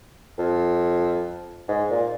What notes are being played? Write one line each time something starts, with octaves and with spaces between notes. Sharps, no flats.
F2
G#2
A#2